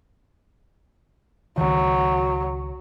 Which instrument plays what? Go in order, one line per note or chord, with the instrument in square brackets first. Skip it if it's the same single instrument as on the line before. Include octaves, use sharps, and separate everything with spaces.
[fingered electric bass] C#2 D#3 [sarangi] F#3